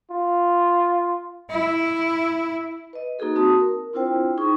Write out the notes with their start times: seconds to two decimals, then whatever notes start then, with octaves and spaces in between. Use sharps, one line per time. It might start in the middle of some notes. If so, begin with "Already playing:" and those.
0.11 F4
1.50 E4
2.93 B4 D#5
3.19 A#3 D#4 F#4 G#4 A4
3.36 C4 F#4 A5 D#6
3.60 A#4
3.93 C4 D4 E4 F4 C5 G5
4.38 D#4 G#4 C#6